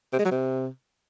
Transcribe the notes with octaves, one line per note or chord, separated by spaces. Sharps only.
C3
G#3
F#3
C3